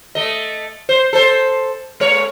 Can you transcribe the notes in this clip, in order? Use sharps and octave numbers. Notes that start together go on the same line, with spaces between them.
A3 D#5
C5
A4 C5
G#3 C#5